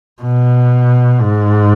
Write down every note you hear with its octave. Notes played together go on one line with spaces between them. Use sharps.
B2
G#2